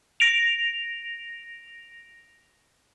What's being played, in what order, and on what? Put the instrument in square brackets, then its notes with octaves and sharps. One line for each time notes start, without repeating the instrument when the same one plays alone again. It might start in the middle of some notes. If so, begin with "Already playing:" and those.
[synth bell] A#6 D7 F7